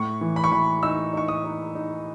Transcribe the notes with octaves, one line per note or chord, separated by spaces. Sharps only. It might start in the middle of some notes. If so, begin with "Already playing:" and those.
Already playing: A2 C#6
E3
B5
C#6
E3 B5
D#4 E6
D#4 C#6
D#6
D#4
D#4